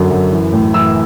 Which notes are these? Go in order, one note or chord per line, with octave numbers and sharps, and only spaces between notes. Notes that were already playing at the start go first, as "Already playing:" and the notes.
Already playing: F#2 D3 F#3
F#2
E3
A2
E3 E6